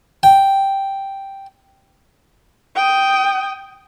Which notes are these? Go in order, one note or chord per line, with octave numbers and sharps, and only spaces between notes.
G5
G5 D#6